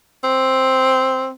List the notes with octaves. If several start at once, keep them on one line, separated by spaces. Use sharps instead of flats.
C4